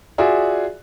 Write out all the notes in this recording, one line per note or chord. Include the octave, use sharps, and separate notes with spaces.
F4 F#4 G#4 D5 E5